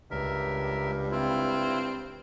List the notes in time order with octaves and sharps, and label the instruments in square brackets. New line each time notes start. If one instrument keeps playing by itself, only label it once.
[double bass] C#2 [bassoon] G2 [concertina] A#4 E5
[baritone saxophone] C4 [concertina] E4 F4